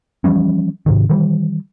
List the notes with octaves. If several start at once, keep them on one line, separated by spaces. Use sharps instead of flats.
E3 F3 G3 C#4
G#2 C3 D#3
D#3 E3 G3